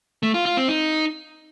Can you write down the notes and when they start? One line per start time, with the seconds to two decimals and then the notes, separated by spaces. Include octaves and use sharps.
0.23 A3
0.34 F4
0.45 F4
0.57 C4
0.68 D#4